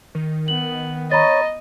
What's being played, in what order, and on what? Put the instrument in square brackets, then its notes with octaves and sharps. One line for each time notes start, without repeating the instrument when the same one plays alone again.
[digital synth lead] D#3
[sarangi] B3 [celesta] F#7
[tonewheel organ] C#5 [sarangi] D#5 [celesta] A#5 B5 A6